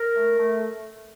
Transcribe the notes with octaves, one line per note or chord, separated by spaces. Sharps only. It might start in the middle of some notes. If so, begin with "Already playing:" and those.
Already playing: A#4
A3
A3